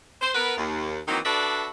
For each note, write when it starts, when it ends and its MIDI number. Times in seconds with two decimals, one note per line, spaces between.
0.21 0.30 72
0.35 0.56 59
0.35 0.56 70
0.35 0.56 71
0.57 0.98 39
1.08 1.19 51
1.08 1.19 52
1.08 1.19 54
1.08 1.19 58
1.08 1.19 60
1.08 1.19 63
1.25 1.70 62
1.25 1.70 66
1.25 1.70 69
1.25 1.70 71
1.25 1.70 74
1.25 1.70 76